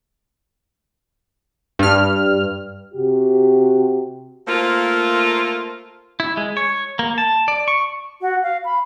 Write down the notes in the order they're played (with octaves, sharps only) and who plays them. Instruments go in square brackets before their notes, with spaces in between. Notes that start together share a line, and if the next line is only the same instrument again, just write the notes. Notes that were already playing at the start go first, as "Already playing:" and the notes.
[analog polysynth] G2 F6
[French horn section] C3 F#4 G4
[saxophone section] A3 A#3 F4 A4 A#4 C5
[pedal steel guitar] E4
G#3
C#5
A#3
A5
D5
C#6
[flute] F#4
F5
B5